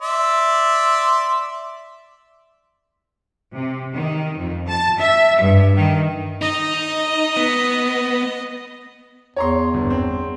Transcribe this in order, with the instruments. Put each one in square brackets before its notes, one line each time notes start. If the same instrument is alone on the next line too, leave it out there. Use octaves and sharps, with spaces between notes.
[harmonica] D5 E5 C6
[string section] C3
D#3
F2
A5
E5
G2
D#3
[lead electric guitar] D#4 [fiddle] D#5
[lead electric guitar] B3
[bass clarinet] E2 [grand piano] C#5 A#5 C6
[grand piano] G1
C4